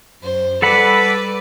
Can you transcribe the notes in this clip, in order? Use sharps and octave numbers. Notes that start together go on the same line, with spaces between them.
F#2 C5
G3 A4 B4 D5 F#5 B5